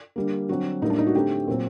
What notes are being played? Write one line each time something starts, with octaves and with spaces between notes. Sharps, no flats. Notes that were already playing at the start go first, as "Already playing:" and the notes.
D3 G3 A#3
D3 F#3 C4 F#4
A2 G3 A#3 D#4
D4
D#4
F#4
D3 A3 C4 G4
A#2 F#3 C4